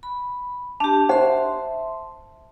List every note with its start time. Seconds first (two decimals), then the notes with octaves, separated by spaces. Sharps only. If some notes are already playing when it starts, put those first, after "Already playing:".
0.03 B5
0.80 D4 G4 A5
1.09 C5 E5 F#5 C6